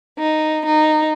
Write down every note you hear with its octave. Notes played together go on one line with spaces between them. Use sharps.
D#4
D#4